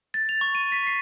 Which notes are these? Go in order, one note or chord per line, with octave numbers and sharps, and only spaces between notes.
A6
F7
C#6
D#7
B6
C7